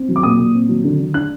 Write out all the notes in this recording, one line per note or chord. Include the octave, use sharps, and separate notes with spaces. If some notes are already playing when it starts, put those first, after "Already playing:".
Already playing: C4
F#3
D6
A#2 D#6
A#2
C4
F#3
D3
D3
D4 F#6